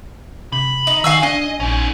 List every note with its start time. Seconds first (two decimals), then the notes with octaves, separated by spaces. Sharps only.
0.52 C3 B5
0.87 D#4
1.04 D#3 F#4 F5 G#5 E6
1.23 D4 D#5 G#5
1.60 A#1 C#4 D#4